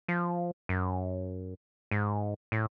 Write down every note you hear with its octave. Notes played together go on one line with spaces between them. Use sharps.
F3
F#2
G#2
A2